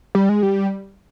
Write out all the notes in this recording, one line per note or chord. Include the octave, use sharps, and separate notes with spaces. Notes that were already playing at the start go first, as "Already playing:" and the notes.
G3
G#3
G3